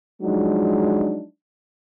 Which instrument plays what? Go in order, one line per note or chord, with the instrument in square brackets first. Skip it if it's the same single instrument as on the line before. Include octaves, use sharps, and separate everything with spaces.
[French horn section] F3 F#3 G#3 D4 D#4